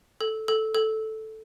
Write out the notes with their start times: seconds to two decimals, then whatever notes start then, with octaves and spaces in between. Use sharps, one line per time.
0.21 A4
0.48 A4
0.75 A4